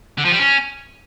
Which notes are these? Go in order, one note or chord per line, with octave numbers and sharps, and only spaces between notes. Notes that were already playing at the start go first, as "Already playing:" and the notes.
D3
F3
G3
C#4